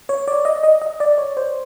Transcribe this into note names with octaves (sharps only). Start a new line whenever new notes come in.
C#5
D5
D#5
D#5
D#5
D5
C#5
C5